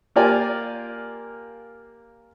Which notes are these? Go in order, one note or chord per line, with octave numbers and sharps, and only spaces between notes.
A#3 F4 G4 A#4 D5 G#5